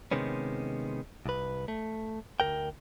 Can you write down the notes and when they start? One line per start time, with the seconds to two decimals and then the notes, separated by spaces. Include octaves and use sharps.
0.11 C3 D#3 G#3 B3 C#4
1.26 C2 B4
1.68 A3
2.40 D2 A#2 A#4 G5